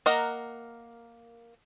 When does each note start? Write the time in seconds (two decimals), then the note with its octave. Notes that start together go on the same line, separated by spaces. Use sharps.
0.06 A#3 A#4 D#5 F#5 A#5